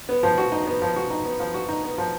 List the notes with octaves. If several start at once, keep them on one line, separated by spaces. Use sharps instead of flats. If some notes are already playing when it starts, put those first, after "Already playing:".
B3
F3
F#4
D#4
B3
F3
F#4
D#4
B3
F3
F#4
D#4
B3
F3